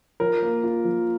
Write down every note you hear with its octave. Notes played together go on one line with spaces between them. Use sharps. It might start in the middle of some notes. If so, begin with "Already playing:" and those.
F3 A#4
A#3
F4
F3